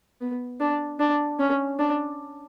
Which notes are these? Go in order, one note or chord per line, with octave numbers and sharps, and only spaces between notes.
B3
D4
D4
C#4
D4